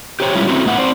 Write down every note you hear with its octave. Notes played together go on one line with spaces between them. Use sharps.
G4 C5 C#5 G5
G3 G#3 C#4 E4 F4
A3 C4 C#4 E4 F#4
A2 A3 B3 E5 F#5
C4 C5 D5